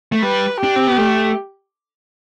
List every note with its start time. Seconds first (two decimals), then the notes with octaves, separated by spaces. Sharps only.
0.12 A3
0.22 G3 B4
0.61 D4 G4
0.76 C4
0.87 B3
0.98 A3